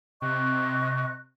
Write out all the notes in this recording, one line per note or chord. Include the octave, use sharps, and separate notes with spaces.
C3 D#5 C#6 F#6